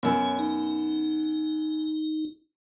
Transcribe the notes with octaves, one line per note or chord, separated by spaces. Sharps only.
F#2 B2 C#5
D#4